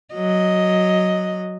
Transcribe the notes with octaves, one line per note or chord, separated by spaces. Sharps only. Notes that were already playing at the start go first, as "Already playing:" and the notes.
F#3 D#5